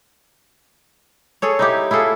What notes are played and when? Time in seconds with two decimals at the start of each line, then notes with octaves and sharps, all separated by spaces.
1.42 G#4 A4 C#5
1.59 D#4 E4 G4
1.91 E4 F4 G#4 A4